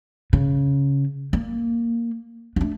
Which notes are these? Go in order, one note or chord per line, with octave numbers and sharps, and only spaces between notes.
C#3
A#3
A3 D4